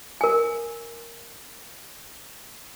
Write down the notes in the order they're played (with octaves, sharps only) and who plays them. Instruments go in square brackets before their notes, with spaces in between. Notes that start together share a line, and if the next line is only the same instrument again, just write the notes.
[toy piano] A#4 G#5